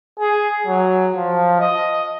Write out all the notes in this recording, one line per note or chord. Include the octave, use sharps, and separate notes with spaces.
G#4
F#3
F3
D#5